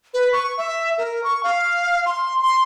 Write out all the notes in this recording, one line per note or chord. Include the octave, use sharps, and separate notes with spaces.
B4
C#6
E5
A#4
C#6
F5
C6
C6